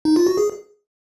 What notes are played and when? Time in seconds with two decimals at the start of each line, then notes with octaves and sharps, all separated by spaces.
0.05 D#4
0.16 F4
0.27 F#4
0.37 G#4